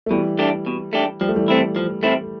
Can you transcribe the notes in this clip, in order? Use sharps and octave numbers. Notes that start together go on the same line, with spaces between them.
A3
B2 E3 G3
A3 D4 G4
B2
A3 D4 G4
F3 G3
A3
E3 G3
A3 C4 E4
F3
A3 C4 E4